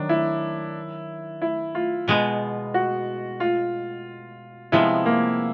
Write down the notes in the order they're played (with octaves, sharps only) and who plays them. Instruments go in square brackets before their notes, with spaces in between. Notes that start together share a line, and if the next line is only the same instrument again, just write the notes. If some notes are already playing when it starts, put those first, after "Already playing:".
Already playing: [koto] D#3 F#3 [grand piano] D4
[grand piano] E4
E4
F4
[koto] B2 G#3 B3
[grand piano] F#4
F4
[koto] C3 F3 G#3 B3 [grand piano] E4
[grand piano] A#3